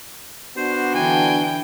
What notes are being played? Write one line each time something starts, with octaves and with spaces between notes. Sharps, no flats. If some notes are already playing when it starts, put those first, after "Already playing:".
B3 D4 F#4 C5
D3 E3 G5 G#5